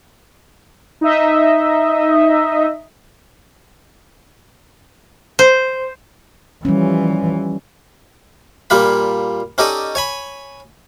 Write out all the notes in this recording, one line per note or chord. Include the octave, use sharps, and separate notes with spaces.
D#4 D#5 E5
C5
E3 F3 G3 C#4
A#2 G3 A#3 F4 B5
C#4 D#4 G4 A4 D5 D#5
C#5 G#5 B5